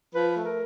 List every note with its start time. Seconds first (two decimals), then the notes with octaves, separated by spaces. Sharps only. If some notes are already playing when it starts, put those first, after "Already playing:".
0.14 F3 B4
0.35 A3
0.45 A#4